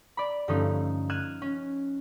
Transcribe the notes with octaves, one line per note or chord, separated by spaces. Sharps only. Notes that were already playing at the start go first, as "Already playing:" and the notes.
D5 B5
G2 D3 F3 A3 C#4 D#4
F6 F#6 G#6 D#7 E7
C#4